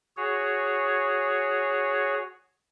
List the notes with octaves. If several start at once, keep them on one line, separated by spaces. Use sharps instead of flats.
F#4 G#4 C#5